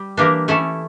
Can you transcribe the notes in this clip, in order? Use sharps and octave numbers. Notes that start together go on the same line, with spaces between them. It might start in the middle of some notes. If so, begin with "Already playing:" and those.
Already playing: G3
E3 A#3 D4 G4 A#4
A3 C#4 E4 A4